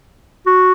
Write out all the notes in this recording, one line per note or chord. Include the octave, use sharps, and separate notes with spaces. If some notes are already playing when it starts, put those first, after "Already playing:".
F#4